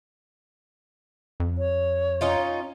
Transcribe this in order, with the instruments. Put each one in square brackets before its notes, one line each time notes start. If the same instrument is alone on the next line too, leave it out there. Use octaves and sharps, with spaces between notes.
[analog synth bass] F2
[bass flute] C#5
[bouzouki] C#4 D#4 F4